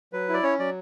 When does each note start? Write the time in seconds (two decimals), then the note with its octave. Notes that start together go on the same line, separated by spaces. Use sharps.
0.13 F#3 B4
0.28 E4
0.34 D5
0.43 C#4 C#5
0.59 F#3 D5